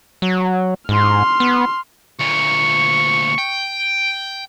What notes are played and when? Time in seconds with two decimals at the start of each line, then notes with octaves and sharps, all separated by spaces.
0.22 F#3
0.89 G#2 C6 F6
1.40 B3
2.20 D2 A#2 C#6
3.38 G5